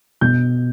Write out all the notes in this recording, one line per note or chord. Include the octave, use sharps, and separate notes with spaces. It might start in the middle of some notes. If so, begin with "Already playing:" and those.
B2 G6